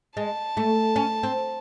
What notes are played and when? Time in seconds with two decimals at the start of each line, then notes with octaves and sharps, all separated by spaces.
0.17 G#3 A5
0.57 A3
0.96 C#4
1.23 C4